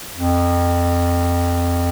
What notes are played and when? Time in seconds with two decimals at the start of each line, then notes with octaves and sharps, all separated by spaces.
0.16 F2